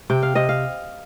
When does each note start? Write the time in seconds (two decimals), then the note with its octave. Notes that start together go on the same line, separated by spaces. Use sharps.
0.10 C3 G5
0.23 F5
0.35 C3 D#5
0.49 F5